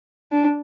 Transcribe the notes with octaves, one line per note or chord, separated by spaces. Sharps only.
D4